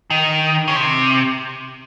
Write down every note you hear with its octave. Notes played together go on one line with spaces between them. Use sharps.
D#3
C#3
C3